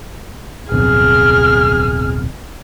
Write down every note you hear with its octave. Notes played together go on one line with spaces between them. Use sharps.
D1 B1 F2 G#4 F6